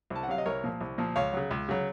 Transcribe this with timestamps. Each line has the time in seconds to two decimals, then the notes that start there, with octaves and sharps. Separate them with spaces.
0.10 C2
0.15 A5
0.23 F#5
0.28 C3 F#3 F5
0.38 D#5
0.46 C2 A#4 C#5
0.63 A#2 F3
0.81 C2
0.98 A#2 F3
1.16 C#2 C#5 F5
1.33 C#3 F#3
1.51 C#2
1.69 C#3 F#3